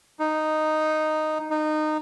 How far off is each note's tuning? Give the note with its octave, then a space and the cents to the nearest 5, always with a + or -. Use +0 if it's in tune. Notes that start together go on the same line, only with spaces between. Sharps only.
D#4 -5
D#4 -20